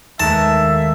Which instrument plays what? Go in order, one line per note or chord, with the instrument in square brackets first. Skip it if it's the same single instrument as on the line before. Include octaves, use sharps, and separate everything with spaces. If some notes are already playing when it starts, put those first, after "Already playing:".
[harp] D#2 G#3 A3 [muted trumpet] E5 [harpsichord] A5